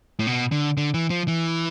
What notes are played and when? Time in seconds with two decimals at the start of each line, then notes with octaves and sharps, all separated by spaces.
0.19 A2
0.27 B2
0.52 D3
0.77 D3
0.94 E3
1.10 F3
1.28 E3